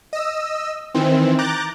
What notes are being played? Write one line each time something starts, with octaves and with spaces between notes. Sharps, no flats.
D#5 E6
D#3 E3 C4
A#5 D6 F#6 G6 A6